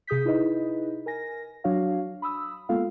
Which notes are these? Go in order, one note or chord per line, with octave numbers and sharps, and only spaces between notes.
C3 G#4 D#6 G6 B6
D#4 E4 G#4 B4 D#5
A#4 G#5 A#6
F#3 D4 F#4 C#5 F5
B5 D#6 E6
G#3 A#3 B3 F4 A4 F5